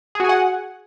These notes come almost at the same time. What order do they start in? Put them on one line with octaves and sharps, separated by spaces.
G#4 F#4 G#5 F#5